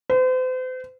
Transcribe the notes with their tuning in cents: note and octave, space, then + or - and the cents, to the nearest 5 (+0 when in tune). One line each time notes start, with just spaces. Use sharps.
C5 -40